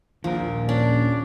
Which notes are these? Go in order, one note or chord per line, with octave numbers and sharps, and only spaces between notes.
A#1 D#2 A#2 F3 A#4
C#4 D4